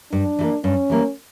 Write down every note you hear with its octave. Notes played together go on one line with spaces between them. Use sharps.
G2 D4
E3 G3 A#3
G2 C#4
E3 G3 A#3